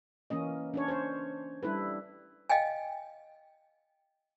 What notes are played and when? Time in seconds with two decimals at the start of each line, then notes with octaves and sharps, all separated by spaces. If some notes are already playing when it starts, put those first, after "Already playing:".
0.30 E3 A#3 C#4 D#5
0.74 C#4 D4 C#5
0.88 C5 C#5
1.63 G3 D4 E4 A4 B4
2.49 D#5 F5 G5 G#5